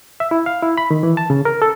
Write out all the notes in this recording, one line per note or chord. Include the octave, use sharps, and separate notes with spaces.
E5
E4
F5
E4
B5
D#3
E3
A5
C#3
A#4
A4